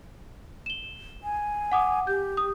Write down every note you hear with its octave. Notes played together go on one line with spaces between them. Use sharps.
E7 G7
G#5
F#5 D6 D#6
G4 G6
D#6